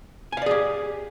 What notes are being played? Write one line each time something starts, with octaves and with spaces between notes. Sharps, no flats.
G4 G#4 D5 F5 G#5